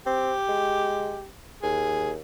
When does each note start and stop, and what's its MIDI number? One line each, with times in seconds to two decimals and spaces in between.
0.06 0.33 60
0.06 1.25 67
0.49 1.18 56
1.63 2.19 39
1.63 2.11 68